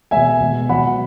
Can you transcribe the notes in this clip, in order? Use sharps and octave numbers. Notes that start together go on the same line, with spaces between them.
B2 G#3 E5 G#5
B2 G#3
B2 F#3 F#5 B5